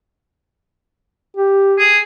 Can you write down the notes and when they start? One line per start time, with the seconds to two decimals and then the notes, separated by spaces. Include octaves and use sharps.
1.37 G4
1.78 G#4